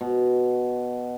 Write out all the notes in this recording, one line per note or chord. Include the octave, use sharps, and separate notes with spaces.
B2